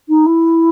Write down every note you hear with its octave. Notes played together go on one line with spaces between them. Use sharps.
D#4
E4